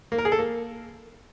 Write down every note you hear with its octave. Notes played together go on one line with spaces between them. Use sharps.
A#3
A#4
G#4
A4
A#3